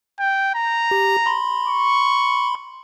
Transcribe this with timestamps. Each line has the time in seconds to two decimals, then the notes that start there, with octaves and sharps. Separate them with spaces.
0.20 G5
0.55 A#5
0.91 G4
1.26 B5 C6
1.67 C#6